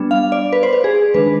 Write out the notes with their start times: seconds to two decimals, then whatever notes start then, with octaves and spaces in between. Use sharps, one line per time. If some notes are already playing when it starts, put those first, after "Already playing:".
Already playing: G3 B3 D4
0.11 F5
0.32 D5
0.53 B4
0.63 C5
0.73 B4
0.84 G#4
1.14 D#3 G#3 D4 B4